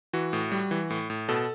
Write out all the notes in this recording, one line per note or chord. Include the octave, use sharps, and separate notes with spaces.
E3 F#4
A2
G3
E3
A2
A2
B2 A4